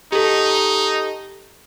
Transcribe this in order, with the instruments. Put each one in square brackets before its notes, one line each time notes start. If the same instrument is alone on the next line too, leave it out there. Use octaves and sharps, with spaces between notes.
[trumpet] D#4 [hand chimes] G4 A4